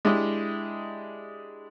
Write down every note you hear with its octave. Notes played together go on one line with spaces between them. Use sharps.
G#3 D4 E4 G4 D#5